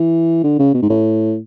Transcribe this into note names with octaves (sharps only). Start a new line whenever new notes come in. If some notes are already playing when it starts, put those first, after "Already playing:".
Already playing: E3
D3
C#3
B2
G#2
A2